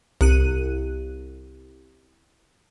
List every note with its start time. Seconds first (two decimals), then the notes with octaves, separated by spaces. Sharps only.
0.21 C2 F#6 D#7